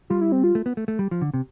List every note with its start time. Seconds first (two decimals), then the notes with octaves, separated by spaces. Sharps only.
0.10 G3 F4
0.21 E4
0.32 C4
0.44 F4
0.55 A3
0.66 B3
0.77 A3
0.88 A3
0.99 G3
1.11 F3
1.21 D3
1.34 C3